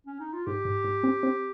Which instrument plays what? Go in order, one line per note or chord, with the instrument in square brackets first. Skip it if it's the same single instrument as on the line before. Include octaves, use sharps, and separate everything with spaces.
[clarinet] C#4
D#4
F4
[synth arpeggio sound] G#2 [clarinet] G4
[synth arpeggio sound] G#2
G#2
C4
C4